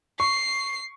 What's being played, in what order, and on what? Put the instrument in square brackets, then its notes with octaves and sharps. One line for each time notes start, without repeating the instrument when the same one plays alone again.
[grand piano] C#6 [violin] C7